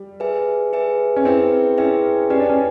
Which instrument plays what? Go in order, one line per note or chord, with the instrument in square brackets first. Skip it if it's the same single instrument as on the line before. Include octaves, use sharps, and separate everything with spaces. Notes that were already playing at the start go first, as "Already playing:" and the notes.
Already playing: [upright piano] G3
[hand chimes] G#4 B4 E5 G#5
G#4 B4 E5 G#5
[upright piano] C#4
[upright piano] C4 [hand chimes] E4 G#4 B4 E5 G5
[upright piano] C#4 [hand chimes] E4 G#4 B4 E5 G5
[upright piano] C#4 [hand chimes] G4 B4 D5 G5
[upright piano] D4
C#4